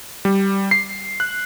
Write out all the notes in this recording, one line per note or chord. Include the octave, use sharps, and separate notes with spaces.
G3
C7
F#6